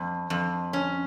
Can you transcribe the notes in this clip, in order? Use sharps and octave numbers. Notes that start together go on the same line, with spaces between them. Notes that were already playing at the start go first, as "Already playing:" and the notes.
Already playing: F2
F2
C#4